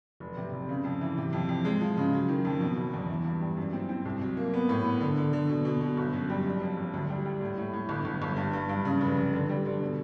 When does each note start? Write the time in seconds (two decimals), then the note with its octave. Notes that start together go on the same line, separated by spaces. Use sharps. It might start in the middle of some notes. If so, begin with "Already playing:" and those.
0.20 F1
0.37 C3
0.53 F1
0.69 C#3
0.84 F2
1.01 E3
1.17 C3
1.33 F2
1.49 F2
1.65 G#3
1.81 F3
1.97 C#3
2.13 F#3
2.29 D#3
2.45 F2
2.61 B2
2.77 F#1
2.93 E2
3.09 E3
3.25 G2
3.41 G3
3.57 F#2
3.73 C4
3.89 C4
4.05 C2
4.21 F#3
4.37 A#3
4.54 B3
4.69 A2
4.85 B3
5.01 D3
5.17 D3
5.33 D3
5.49 B2
5.65 B2
5.81 B2
5.97 G1
6.13 F#2
6.30 G3
6.45 F#1
6.61 F2
6.77 F#1
6.93 D2
7.09 G3
7.25 G3
7.41 A2
7.58 A2
7.73 A2
7.89 G1
8.05 G1
8.22 G1
8.36 G2
8.53 G2
8.69 G2
8.85 C#3
9.01 F1
9.17 F1
9.33 D3
9.49 G3
9.65 D3
9.81 B2